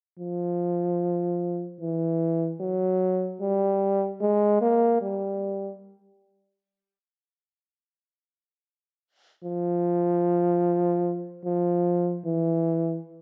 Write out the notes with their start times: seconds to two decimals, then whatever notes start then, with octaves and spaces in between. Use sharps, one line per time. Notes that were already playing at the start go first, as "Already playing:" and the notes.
0.20 F3
1.81 E3
2.61 F#3
3.41 G3
4.21 G#3
4.61 A#3
5.02 G3
9.44 F3
11.45 F3
12.26 E3